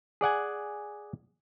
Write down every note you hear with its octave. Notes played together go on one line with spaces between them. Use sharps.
G#4 D5 F#5 G#5